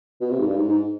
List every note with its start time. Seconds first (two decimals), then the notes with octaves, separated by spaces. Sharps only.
0.21 B2
0.30 C3
0.39 G#2
0.47 G2
0.56 G#2
0.68 G#2